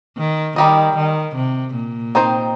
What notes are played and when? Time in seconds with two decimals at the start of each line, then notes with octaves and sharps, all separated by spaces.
0.17 D#3
0.56 D#3 G3 D#4 G4 D#5
0.96 D#3
1.36 C3
1.75 A#2
2.15 D#3 C4 D#4 C5